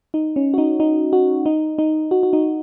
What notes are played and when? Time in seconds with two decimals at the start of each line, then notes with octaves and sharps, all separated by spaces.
0.14 D#4
0.36 C#4
0.54 F#4
0.58 D#4
0.80 D#4
1.13 F#4
1.46 D#4
1.78 D#4
2.11 F#4
2.23 F#4
2.33 D#4